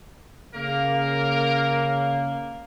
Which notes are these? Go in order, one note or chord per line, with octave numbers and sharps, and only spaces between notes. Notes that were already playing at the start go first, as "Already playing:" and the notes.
C#3 A#3 A#4